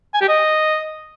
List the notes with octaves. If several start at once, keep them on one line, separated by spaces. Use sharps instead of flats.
G#5
G4
D#5